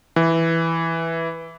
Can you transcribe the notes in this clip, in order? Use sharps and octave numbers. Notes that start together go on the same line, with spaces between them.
E3